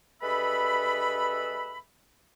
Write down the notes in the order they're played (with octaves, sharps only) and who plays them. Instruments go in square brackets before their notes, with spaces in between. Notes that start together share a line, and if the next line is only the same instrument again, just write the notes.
[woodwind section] G2 G#3 A4 B4 E5 B5